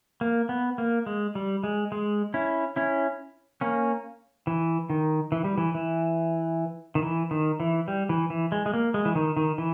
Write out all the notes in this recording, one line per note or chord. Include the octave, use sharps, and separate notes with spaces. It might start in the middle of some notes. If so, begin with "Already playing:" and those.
A#3
B3
A#3
G#3
G3
G#3
G#3
C#4 E4
C#4 E4
A#3 C#4
E3
D#3
E3
G3
E3
E3
D#3
E3
D#3
E3
G3
E3
E3
G#3
G#3
A#3
G#3
E3
D#3
D#3
E3